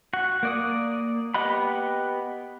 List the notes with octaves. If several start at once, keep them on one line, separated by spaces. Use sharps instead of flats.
F#4 F#5
A#3 D5 D#6
B3 G4 D#5 F#5 B5